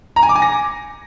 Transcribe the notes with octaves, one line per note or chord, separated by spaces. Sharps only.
A#5
G#5
D6
G#5
A#6